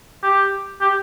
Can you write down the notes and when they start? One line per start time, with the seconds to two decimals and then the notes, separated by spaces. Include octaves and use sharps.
0.23 G4
0.81 G4